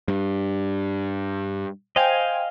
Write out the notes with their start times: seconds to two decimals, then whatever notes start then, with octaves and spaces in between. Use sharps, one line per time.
0.08 G2
1.96 C5 D#5 F5 G5 G#5